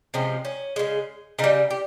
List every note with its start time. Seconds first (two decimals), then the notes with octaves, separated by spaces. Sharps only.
0.14 C3 F3 G#3 C#4
0.45 C#4
0.76 C#3 G#3
1.39 C#3 D#4
1.44 G3
1.70 G4